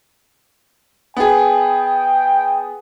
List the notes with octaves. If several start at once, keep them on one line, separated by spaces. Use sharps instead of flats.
B3 G#4 G5